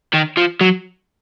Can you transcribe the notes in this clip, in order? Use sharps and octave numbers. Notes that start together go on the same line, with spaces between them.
D#3
F3
F#3